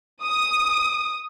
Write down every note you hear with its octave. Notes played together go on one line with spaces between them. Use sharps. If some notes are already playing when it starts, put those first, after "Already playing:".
D#6